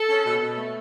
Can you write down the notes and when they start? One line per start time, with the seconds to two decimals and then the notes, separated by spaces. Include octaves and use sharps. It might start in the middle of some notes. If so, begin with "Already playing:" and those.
Already playing: A4
0.09 C#4
0.25 B2
0.41 B2
0.57 A3